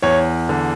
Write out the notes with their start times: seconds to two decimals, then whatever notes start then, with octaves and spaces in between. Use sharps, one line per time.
0.02 E2 C#5
0.49 D3